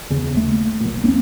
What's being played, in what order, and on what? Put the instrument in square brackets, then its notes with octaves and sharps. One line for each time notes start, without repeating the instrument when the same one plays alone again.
[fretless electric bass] E2 C#3
D#2 A3
B1 A#2
E2 A#3 C4 C#4